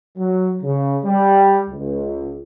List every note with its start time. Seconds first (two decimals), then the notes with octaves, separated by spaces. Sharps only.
0.17 F#3
0.63 C#3
1.04 G3
1.69 C#2